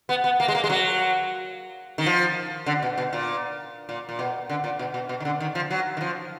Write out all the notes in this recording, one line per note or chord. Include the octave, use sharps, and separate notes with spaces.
B3
B3
A#3
G#3
A#3
G#3
F#3
D#3
F3
D3
B2
B2
A#2
A#2
A#2
B2
D3
A#2
B2
B2
B2
D#3
D3
D#3
F3
F#3
D#3
F3